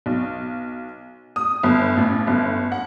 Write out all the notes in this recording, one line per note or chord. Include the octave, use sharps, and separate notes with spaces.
B1
D#6
G1
A1
G1
F#5